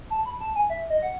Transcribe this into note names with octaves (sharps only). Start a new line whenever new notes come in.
A5
B5
A5
G#5
E5
D#5
F#5